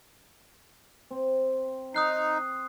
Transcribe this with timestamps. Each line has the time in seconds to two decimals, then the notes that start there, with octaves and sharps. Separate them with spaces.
1.11 C4
1.94 D#4 D#6 F#6 C7